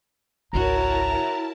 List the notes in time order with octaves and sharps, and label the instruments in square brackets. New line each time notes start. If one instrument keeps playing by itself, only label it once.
[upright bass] G#1 C#2 [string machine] E4 A#4 A5 [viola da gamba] F#4 C#5 [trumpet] A#5